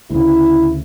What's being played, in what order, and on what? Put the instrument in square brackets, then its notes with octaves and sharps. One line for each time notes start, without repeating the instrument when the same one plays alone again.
[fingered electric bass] D2 C#3 [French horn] E4